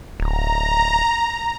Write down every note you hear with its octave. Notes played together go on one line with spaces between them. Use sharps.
D1 A#5